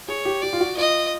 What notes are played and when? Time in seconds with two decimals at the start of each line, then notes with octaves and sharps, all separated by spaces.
0.08 G#4 C#5
0.25 G4
0.42 G4 D5
0.53 F4
0.60 F#4
0.77 F4 D#5